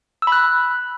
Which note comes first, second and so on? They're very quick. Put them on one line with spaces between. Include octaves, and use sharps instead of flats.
E6 B5 F#6